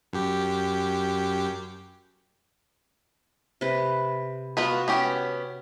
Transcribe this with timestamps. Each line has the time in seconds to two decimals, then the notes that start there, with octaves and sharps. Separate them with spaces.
0.13 F#2 G4
3.61 C3 B4
4.57 B3 F4 F#4 B4
4.88 B3 C#4 G4